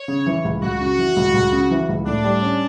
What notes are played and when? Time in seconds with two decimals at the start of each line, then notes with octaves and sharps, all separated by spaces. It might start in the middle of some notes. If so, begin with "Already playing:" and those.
Already playing: C#5
0.08 C#3
0.26 E3
0.45 C#2
0.62 C#2 F#4
0.80 C#3
0.98 E3
1.16 C#2
1.34 C#2
1.53 C#3
1.71 E3
1.89 C#2
2.06 A2 D4
2.24 G3
2.43 C#4